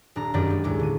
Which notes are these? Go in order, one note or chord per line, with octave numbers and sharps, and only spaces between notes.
D#1 D4 A#5
G1 F#2 D#3 G4 D5 D#5
G#3
D#2 A2 G#3 D6
D3 D#7